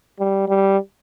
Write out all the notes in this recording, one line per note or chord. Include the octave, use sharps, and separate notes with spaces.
G3
G3